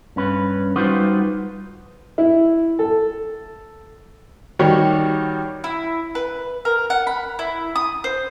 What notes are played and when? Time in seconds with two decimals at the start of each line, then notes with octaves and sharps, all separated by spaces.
0.16 G2 C#4 B4
0.76 G3 D#4 F4 F#4 B4 C5
2.18 E4
2.79 A4
4.59 D#3 G3 F#4 G4 C#5
5.64 E4
6.15 B4
6.65 A#4
6.90 F#5
7.07 B5
7.39 E4
7.76 D#6
8.04 C5